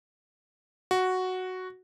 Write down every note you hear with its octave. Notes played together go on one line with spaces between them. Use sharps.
F#4